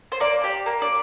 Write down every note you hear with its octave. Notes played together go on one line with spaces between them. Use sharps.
C5
A#3 D5
G4
A#3
D5